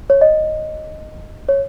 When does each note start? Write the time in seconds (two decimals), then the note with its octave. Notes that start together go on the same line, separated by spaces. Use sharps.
0.10 C#5
0.21 D#5
1.49 C#5